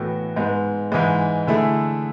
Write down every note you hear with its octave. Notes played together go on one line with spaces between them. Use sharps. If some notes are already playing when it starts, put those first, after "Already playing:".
Already playing: A2 E3 B3 F#4
G#2 G#3 B3
G#2 E3 G#3
D3 A3 E4 G#4